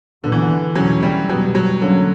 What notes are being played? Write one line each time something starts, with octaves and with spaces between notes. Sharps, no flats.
A#2 D3 F#3 B3
E3
D3
E2 B2 F#3 G3 C#4
G3
B2 F#3 G3 B3
F#3
D3 F#3 A#3 C#4